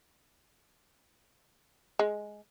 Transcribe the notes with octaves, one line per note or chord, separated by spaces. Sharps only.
G#3